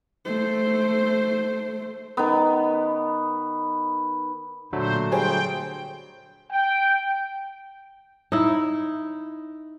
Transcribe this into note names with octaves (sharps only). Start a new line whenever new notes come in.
A3 C5
D#3 B3
A#2 D3 F#3 A3 C5
G3 G#4 C5 G5
G5
D#4 E4